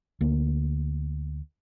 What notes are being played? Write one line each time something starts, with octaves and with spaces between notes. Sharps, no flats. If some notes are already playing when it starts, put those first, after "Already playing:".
D2 A#3